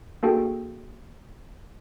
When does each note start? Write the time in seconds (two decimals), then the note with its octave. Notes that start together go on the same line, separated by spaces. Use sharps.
0.23 A#3 D4 F#4 G#4 A4 G5